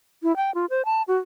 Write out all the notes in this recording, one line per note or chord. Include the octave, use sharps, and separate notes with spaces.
E4
G5
F4
C5
A5
F#4